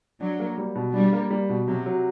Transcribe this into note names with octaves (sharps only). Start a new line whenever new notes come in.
F#3 D4
A#3
G3
B2
G3 D4
A#3
G3
B2
C3 F#3
F#3